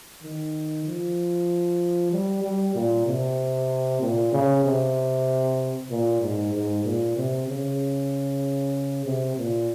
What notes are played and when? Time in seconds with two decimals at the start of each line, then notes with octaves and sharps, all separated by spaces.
0.23 D#3
0.86 F3
2.12 G3
2.44 G3
2.75 A#2
3.06 C3
4.01 A#2
4.32 C#3
4.64 C3
5.90 A#2
6.22 G#2
6.54 G#2
6.85 A#2
7.16 C3
7.48 C#3
9.06 C3
9.37 A#2